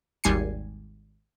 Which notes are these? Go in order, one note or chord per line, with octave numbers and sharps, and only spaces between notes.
G#1 D#2 G3 G#5 C7 C#7